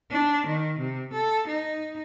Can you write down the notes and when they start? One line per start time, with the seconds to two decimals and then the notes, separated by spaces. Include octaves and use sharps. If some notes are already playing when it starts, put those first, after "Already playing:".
0.11 D4
0.47 D#3
0.78 C3
1.11 A4
1.48 D#4